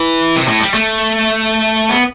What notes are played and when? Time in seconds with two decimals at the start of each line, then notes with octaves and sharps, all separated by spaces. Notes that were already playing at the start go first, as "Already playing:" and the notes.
Already playing: E3
0.36 C3
0.48 A2
0.61 G3
0.74 A3
1.89 B3